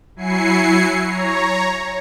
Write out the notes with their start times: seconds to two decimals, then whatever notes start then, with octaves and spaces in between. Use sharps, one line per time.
0.16 F#3 E4 G#5 C7 C#7
1.04 C#5 A#5